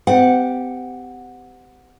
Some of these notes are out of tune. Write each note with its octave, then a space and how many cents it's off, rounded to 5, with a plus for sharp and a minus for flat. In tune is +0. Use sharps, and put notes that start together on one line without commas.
C4 -45 G4 +0 F#5 -10